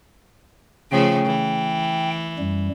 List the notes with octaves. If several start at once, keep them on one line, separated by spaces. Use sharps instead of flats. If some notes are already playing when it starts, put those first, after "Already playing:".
C#3 F3 A3 G5
E3
F#2 G3